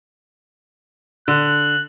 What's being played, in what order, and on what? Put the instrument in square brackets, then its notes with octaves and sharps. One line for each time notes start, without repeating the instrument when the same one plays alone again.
[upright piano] D3 [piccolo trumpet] F#6